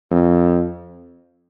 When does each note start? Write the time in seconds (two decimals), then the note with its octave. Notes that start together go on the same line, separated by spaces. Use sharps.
0.11 F2